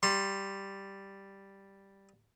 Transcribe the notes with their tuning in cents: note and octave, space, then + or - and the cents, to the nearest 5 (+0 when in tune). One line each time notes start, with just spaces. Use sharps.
G3 +0 C6 +15